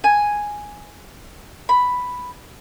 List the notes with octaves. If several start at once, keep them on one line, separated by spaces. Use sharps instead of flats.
G#5
B5